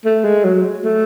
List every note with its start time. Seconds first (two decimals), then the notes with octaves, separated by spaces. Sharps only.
0.05 A3
0.24 G#3
0.44 F#3
0.84 A3